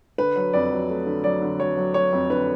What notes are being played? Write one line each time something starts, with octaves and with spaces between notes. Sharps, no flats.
D3 B4
F#3
F2 D5
F#3
A3
D3
F#3 D5
D3
F#3 C#5
F#3
F#3 C#5
F2
D3 B4